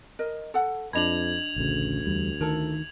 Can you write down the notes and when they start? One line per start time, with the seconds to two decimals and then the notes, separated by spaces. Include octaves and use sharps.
0.19 A#4 D#5
0.54 A4 F#5
0.93 F2 D4 D#5 B5 G#6 F7 F#7
1.56 A1 D2 C#3
2.07 E2 G3
2.41 D#3 E4 A4 A#4